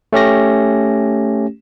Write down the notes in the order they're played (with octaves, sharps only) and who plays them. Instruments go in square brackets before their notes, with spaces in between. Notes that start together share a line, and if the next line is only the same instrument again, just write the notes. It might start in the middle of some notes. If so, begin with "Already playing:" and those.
[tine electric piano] A3 C#4 G4 A#6